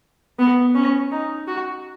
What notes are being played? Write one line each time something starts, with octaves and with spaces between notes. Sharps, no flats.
B3
C#4
D#4
F#4